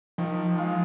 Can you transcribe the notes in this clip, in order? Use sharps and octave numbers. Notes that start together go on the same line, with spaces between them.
D#3 F3
G#3 F4